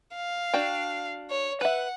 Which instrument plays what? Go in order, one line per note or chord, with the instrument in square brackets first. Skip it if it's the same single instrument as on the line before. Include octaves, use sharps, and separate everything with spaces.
[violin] F5
[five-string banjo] D4 F#4 G5
[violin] C#5
[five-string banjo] B4 E5 [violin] F#5